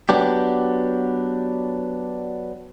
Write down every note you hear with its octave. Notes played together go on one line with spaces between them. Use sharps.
F#3 B3 D4 G4